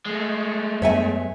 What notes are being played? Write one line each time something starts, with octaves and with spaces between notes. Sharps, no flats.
G#3 A3
F#2 G3 B3 C#5 E5 G#5